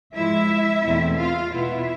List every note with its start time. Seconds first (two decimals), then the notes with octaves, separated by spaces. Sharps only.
0.14 G#2 F3 G#3 E4 E5
0.84 E2 B2 A3 C4 E4
1.17 F4 F5
1.52 B2 B3 E4 F4 E5